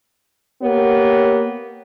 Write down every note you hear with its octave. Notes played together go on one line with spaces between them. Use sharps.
A#3 B3 G4 C#5